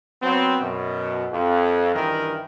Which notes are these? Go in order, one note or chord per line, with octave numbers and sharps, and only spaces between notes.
F#3 B3 C4
F#2 B2
F2
G2 D#3 E3 A#4